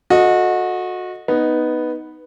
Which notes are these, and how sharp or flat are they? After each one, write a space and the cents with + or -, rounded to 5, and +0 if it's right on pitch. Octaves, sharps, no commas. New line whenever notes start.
F#4 -25 A4 +0 D#5 +0
B3 +0 D#4 +0